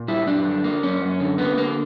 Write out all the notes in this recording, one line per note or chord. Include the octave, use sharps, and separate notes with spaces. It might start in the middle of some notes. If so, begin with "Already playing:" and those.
Already playing: A#2
G3 E4
F#2 D4
D3
A#3
F#2 C#4
F#2
D3
A#3 B3
D3 A#3